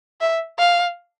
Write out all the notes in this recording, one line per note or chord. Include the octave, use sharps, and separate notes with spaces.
E5
F5